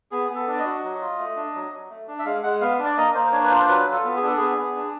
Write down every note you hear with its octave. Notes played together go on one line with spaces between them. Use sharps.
B3 G#4
B3
A4
D4
D5
D#5
F#4
F#3
F4
A3
D4
F#3
F#3
A3
D4
E5
G#3 F5
G#3 F#5
B3 F5
D4
D5
A#3 D#5
A#3 C5
D4 C#5
B4
F4 C5
F#3 B4
F4
A4
B3
G#4
D4 A4
B3 G#4
B3
D4